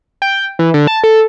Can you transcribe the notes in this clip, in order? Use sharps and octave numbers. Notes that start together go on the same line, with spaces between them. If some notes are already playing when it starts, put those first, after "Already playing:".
G5
E3
D3
A5
A4